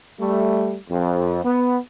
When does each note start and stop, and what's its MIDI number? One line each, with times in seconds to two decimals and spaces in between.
0.20 0.77 55
0.20 0.77 57
0.90 1.42 41
1.45 1.79 59